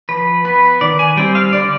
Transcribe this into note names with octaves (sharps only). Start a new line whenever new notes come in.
F3 B4
B3 B4
D#3 D5
G#5
G3 C4 G5
F5
D3 D5